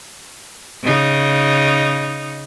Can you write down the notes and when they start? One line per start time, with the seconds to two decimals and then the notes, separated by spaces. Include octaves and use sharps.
0.83 C#3 D#4